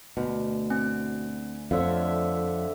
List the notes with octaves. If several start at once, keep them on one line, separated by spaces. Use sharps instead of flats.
D2 B2
C4 G#5
F2 D3 C5 C#5 E5 F5